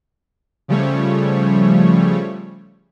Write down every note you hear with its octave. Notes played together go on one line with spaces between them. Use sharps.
C#3 F3 G3 A3 C#5